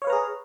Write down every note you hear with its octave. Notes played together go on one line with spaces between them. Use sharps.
G#4 B4 C#5 F5 A#5